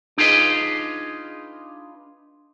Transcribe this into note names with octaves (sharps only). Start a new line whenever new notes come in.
D4 D#4 F4 G#4 B4 D#5